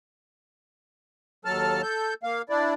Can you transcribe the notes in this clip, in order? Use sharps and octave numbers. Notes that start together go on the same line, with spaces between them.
D#2 F#3 A4 A5 F6
A4 G6
A#3 F5
D4 E4 D5